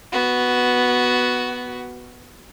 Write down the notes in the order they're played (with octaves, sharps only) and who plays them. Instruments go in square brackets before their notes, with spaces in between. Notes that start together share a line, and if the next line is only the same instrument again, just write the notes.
[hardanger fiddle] B3 F#4